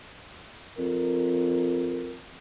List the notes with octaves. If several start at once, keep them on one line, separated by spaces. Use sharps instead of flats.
F2 A#4